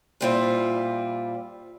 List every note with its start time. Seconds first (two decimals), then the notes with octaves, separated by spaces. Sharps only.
0.21 A#2 G3 C4 E4 F4